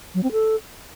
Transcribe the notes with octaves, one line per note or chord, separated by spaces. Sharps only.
F#3
C4
A4